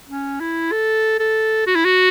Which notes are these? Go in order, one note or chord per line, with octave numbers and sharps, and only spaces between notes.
C#4
E4
A4
A4
F#4
E4
F#4